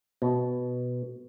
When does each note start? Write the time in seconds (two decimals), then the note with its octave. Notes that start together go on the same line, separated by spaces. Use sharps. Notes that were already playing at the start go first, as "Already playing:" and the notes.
0.22 B2